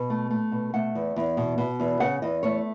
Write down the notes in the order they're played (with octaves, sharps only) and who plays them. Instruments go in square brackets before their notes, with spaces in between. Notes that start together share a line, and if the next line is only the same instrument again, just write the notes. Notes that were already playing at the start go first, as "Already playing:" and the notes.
Already playing: [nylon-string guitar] B2
A3
A3
B2
A3 F#5
E2
E2
B2
B2
E2
C#3 F#5
E2 D#5
A3 C#5